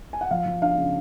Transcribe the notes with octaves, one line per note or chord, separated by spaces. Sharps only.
G#5
F#5
F3 F5
F3
D4 F5
C#3